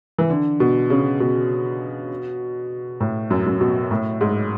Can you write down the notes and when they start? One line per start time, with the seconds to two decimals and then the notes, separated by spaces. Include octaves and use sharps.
0.18 E3
0.30 D3
0.60 B2
0.90 C#3
1.20 B2
3.00 A2
3.30 F#2
3.46 F#2
3.61 B2
3.91 A2
4.21 G#2